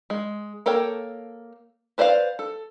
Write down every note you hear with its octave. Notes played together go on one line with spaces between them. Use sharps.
G#3
A#3 A4 A#4 C#5 G5
B4 C5 D5 E5 F5
A4